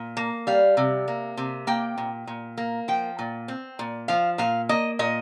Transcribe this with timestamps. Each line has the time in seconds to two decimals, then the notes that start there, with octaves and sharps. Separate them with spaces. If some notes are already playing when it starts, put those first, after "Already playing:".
Already playing: A#2
0.17 A#3
0.47 G3 F5
0.77 C3
1.08 A#3
1.37 C3
1.67 A#3 G5
1.98 A#2
2.27 A#2
2.58 A#3
2.88 F3 G5
3.19 A#2
3.48 C4
3.79 A#2
4.08 F3 F5
4.38 A#2 F5
4.69 A#3 D#5
4.99 A#2 D#5